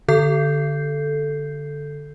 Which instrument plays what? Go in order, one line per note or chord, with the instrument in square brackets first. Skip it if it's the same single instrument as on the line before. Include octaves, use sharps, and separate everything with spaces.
[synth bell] D3 A4 G6 C7